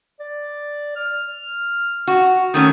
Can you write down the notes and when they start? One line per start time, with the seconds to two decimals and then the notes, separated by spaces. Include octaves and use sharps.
0.20 D5
0.96 F6
2.08 F#4
2.54 D#3 A3 C#4 D#6